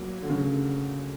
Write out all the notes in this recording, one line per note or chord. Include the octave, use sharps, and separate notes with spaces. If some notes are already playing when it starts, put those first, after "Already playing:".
Already playing: F#3 A#3
D3
C#3